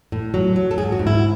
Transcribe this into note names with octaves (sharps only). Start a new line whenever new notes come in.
A2
F#3
F#3
A4
G#2 G#4
F#4
G#2
E4